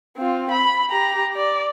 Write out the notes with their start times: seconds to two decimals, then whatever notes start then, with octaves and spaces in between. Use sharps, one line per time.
0.17 C4 F4
0.51 B5
0.90 G4 A#5
1.36 D5